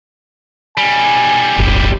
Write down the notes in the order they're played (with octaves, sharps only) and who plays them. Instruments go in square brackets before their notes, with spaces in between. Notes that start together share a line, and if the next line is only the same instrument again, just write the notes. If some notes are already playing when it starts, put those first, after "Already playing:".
[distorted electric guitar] B1 G3 [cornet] G#5
[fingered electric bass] D1 G1